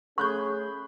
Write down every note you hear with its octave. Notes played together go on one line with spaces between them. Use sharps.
A3 C#4 G#4 A4 B5 C#6 F#6 G6